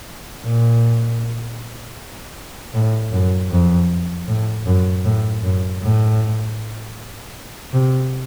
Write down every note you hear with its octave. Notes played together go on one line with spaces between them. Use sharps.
A#2
A2
F#2
F2
A2
F#2
A2
F#2
A2
C3